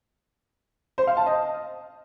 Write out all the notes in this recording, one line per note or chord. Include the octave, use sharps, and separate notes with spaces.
C5
F5
A5
D#5